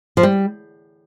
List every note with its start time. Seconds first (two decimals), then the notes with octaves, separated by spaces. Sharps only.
0.17 F3
0.23 G3